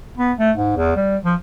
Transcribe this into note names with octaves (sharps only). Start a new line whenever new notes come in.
B3
A3
G#2
E2
G3
F3